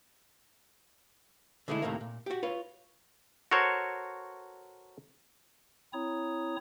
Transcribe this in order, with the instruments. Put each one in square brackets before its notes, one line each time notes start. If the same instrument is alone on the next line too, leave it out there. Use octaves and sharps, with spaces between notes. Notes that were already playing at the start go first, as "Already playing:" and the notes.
[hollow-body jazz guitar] D3 G#3 A3 D#4 E4
C#2 A2 C3 D#3 A3 A#3
A#2
F#4 G4
F4 B4 C#5
[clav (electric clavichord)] F#4 A4 A#4 C5 C#5
[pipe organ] C4 E4 C#5 A#5 D#6